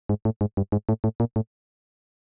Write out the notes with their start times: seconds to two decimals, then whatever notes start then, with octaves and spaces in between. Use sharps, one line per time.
0.09 G#2
0.25 A2
0.41 G#2
0.57 G2
0.72 G#2
0.89 A2
1.04 A2
1.20 A#2
1.36 A2